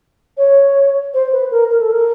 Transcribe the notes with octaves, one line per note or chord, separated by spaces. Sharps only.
C#5
C5
B4
A#4
A#4
A4
A#4